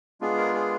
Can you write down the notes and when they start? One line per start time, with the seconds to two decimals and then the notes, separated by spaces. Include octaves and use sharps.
0.21 G#3 B3 D4 F4 G#4
0.38 A#4
0.55 G#4